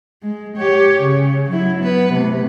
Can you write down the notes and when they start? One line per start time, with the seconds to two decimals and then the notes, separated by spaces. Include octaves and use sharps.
0.22 G#3
0.57 G4 C#5
1.00 C#3
1.50 F#3 E4
1.80 B3 B4
2.13 C3 A3